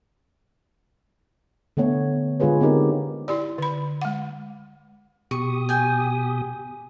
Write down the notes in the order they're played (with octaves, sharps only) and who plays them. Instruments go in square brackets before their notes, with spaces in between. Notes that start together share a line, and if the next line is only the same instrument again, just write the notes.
[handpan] D3 A3 B3 C#5
D3 G#3 F4 G#4 B4 C#5
B3 C4 D#4 G4 A#4
[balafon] E4 G4 D5
D3 B5
G#3 F#5
[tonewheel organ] B2 G4 D#6 [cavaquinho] C#6
[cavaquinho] G5 G#5